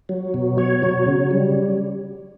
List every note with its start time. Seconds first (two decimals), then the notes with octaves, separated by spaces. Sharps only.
0.09 F#3
0.34 B2
0.58 C#5
0.83 F#3
1.07 C#3
1.31 G3